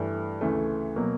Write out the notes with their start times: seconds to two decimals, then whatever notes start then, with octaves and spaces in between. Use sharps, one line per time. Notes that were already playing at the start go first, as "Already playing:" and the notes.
Already playing: G2 E3 A3
0.41 D2 C#3 E3 A3
0.96 B2 F#3 A#3